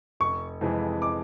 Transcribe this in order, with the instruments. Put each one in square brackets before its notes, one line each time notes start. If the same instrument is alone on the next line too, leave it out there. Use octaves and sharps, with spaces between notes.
[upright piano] F1 [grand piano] C#6
[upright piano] F2 C3 E3 G#3
[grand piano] D6